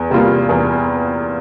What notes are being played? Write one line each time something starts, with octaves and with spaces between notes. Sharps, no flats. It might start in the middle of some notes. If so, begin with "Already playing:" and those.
Already playing: E2
C3 G3 A#3 F4
E2